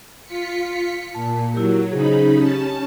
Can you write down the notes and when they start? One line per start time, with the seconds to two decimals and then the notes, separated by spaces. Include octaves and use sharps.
0.25 F4 B6 C#7
1.15 A#2 A5
1.54 F#3 E4 G4 A#4
1.92 C#3 D#4 G#4 C5 B5
2.36 C#4 G4 A5